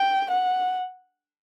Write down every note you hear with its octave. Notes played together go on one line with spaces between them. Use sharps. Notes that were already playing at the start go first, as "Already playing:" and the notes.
Already playing: G5
F#5